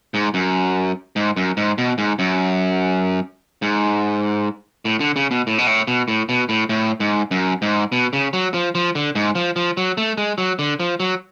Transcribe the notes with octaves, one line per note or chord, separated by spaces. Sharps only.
G#2
F#2
G#2
F#2
G#2
B2
G#2
F#2
G#2
A2
D3
C#3
B2
A2
B2
A2
B2
A2
B2
A2
A2
G#2
F#2
G#2
B2
C#3
F#3
F3
F3
D3
G#2
F3
F3
F#3
A3
G#3
F#3
D3
F3
F#3